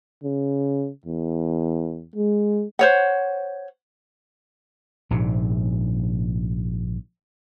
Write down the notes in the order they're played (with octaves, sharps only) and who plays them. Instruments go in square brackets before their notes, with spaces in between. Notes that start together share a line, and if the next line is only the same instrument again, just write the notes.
[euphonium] C#3
E2
G#3
[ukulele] C5 C#5 F#5
[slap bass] A#1 G#2 C3